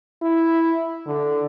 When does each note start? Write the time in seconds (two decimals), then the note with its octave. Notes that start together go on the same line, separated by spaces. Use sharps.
0.22 E4
1.07 D3